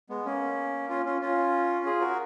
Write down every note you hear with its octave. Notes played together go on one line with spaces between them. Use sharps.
G#3 B3
A#3 C#4
C#4 F4
C#4 F4
C#4 F4
F4 G#4
F#4 A#4